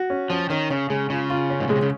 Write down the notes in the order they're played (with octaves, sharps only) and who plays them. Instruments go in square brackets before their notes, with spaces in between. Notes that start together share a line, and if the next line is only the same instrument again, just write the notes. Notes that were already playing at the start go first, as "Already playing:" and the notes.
Already playing: [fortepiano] F#4
C#4
[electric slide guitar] F3 [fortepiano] C#4
[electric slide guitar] D#3 [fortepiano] C#4
[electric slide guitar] C#3 [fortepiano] C#4
[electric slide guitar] C#3 [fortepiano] G#3
[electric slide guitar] C#3 [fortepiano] F4
[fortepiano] F4
C#4
[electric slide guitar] G#2
[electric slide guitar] A#2 [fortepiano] G#3
[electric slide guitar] C3
C#3